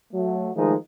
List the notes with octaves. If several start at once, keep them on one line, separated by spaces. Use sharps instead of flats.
F#3 A3
D#3 F3 G#3 A3 D#4